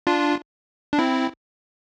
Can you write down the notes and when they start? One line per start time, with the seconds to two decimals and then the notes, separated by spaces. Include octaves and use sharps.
0.07 D4 F4
0.93 D4
0.99 C4 E4